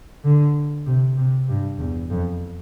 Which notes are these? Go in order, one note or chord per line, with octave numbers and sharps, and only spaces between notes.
D3
C3
C3
G2
E2
F2